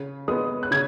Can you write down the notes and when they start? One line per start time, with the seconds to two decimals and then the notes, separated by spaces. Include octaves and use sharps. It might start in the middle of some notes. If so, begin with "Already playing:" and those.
Already playing: C#3
0.28 G#3 B3 D#6
0.63 F#6
0.71 C#3 G#6